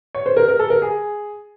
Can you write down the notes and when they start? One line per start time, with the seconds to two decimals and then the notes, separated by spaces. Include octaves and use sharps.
0.15 C#5
0.26 C5
0.37 A#4
0.48 A#4
0.59 A4
0.70 A#4
0.82 G#4